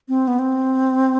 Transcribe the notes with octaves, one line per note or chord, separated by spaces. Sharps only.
C4
B3
C4